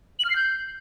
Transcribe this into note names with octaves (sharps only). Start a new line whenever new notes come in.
F#7
F6
C7
G6